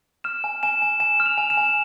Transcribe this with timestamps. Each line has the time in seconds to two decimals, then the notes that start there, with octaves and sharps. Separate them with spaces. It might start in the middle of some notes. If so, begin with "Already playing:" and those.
0.24 F6 E7
0.44 G#5
0.63 G#5 E7
0.82 G#5
1.00 G#5 E7
1.20 F6
1.26 F7
1.38 G#5
1.50 E7
1.57 G#5